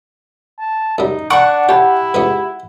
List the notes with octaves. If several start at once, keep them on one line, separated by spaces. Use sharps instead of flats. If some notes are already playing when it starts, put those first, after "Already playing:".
A5
F#2 G3 D#4
D4 F#5 G5 C#6 D6
E4 G4 C#5 A5
C#2 B3 B4